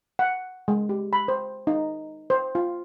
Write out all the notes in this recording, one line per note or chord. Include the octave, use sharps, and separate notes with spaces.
F#5
G#3
G4
B5
C5
D#4
C5
F4